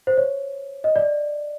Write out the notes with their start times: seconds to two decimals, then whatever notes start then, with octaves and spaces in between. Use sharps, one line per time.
0.07 C5
0.17 C#5
0.84 D#5
0.96 D5